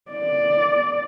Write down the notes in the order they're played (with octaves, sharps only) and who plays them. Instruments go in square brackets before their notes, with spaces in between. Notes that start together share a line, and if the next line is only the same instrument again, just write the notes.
[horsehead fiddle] D5